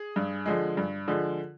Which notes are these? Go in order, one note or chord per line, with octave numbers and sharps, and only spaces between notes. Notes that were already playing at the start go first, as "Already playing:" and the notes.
Already playing: G#4
G2
D3 F3 G#3
G2
D3 F3 G#3